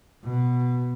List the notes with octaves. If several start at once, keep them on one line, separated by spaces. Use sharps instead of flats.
B2